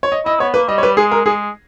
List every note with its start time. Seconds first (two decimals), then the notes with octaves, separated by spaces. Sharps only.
0.03 C#5
0.12 D#5
0.25 E4 D#5
0.40 B3 C#5
0.54 A#3 B4
0.68 G3 D#5
0.78 C#5
0.83 B4
0.96 G#3 G#4
1.12 A#4
1.25 G#3 G#4